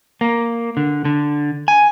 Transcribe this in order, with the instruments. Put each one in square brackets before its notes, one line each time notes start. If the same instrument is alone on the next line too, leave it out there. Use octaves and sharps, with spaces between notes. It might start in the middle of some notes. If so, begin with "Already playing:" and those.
[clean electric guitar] A#3
D3
D3
G#5